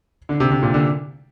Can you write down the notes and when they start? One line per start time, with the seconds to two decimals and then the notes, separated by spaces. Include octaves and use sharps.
0.29 D3
0.40 C3
0.51 C3
0.63 A#2
0.74 D3